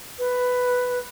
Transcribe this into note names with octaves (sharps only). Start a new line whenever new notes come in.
B4